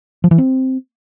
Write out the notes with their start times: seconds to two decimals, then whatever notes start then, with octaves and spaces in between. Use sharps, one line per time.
0.24 F3
0.31 E3
0.38 C4